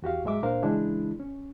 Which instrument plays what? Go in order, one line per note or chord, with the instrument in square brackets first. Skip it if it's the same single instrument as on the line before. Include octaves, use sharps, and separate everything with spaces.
[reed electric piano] E2 F#4 G4 F5
G#2 F#3 G#3 E5 D6
C#2 A#2 D4 A#4 C5 F5
C#3 E3 G#3 D4 E4
C#4